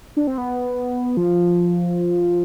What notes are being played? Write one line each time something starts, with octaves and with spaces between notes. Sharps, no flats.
D4
C4
B3
F3